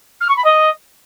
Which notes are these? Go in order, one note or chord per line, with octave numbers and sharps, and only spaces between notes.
F6
C#6
B5
D#5